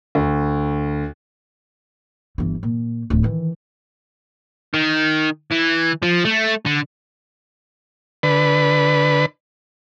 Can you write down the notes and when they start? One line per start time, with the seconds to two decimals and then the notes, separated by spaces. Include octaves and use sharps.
0.15 D2
2.38 G1 E3
2.63 A#2
3.10 D1
3.23 D#3 E3
4.74 D#3
5.52 E3
6.03 F3
6.25 A3
6.66 D3
8.23 D3 B4